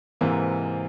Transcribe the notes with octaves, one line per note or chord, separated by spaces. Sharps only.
G#2 C3 E3 A#3